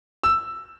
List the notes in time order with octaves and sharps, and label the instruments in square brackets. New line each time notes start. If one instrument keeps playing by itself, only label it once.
[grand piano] E6